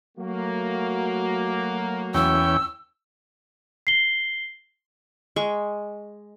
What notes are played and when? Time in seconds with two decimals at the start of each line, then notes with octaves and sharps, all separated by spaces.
0.18 F#3 A3 A#3 F#4
2.14 E2 C#4 G5 E6
3.87 C7 G7
5.36 G#3 C#6